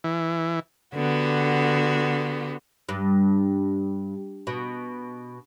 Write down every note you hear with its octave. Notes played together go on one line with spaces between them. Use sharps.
E3
D3 B3 F#4 G4
G2
B2